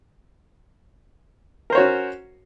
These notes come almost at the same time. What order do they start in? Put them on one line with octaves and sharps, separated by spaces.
A#4 C5 C#5 F#4 C#4